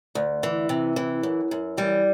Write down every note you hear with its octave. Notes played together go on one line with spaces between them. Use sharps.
D2
E3
C3
E3
F#2
F#2
E3 G3